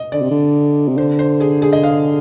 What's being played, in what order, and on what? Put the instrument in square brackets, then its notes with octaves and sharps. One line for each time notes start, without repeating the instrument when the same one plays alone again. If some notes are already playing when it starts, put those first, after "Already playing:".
Already playing: [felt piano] D#5
[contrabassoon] D3 [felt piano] D5
[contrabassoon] C3
D3
C3
[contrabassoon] D3 [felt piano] C5
[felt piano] C5
G#4
G#4
D#5
F5